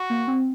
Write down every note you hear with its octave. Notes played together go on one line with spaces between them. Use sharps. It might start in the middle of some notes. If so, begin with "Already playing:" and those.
Already playing: F#4
A#3
C4